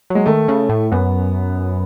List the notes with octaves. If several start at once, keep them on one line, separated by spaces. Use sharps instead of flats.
F#3 G#3
D#3 A3
C#3
A2
F#2 B3